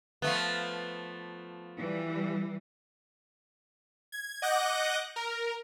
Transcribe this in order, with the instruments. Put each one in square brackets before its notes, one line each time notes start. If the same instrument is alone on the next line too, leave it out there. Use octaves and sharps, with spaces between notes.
[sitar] F3 A3 B3
[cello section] E3 G3
[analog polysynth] G#6
D#5 F#5 D6 F#6 G6 A#6
A#4